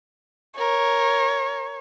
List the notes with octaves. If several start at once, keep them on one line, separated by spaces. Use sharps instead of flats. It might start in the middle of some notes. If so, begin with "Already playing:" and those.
A#4 C#5